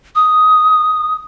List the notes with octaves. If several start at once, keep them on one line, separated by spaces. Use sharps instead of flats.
D#6